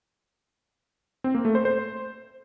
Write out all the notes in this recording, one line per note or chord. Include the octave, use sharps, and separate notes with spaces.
C4
A#3
A3
C5
C5